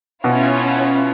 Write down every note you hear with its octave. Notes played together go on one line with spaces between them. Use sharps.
B2 C#4 E4 F4